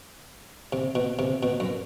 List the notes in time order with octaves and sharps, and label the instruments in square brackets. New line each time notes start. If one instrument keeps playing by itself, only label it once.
[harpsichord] C3
B2
C3
B2
F#2